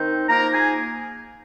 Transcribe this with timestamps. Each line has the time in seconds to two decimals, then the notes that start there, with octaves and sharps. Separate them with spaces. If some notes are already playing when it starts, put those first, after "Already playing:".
Already playing: D#3 C4 D#4
0.29 F3 A#3 D#4 A#4 A#5
0.54 G#4 G#5